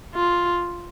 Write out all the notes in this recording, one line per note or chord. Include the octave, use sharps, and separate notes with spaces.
F4